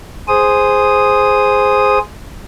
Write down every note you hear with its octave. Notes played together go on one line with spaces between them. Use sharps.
G#4 C5 D#6